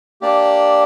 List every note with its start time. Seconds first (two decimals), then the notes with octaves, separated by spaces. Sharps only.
0.21 A#3 D4 G4 D5